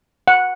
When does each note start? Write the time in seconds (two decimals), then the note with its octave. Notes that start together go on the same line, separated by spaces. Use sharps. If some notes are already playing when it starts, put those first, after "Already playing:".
0.28 F#5